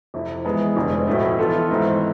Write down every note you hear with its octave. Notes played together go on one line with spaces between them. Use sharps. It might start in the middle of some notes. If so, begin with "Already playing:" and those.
F2 C3 F3 A3 E4
E3 G#3 B3
F1 F2 D3 G#3
B1 A2 F3 A3 E4
E3 B3 F4 A4
G#1 G#2 E3 A3 C4